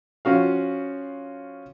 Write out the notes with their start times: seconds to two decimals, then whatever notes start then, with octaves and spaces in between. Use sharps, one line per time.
0.25 F3 C#4 F#4 F5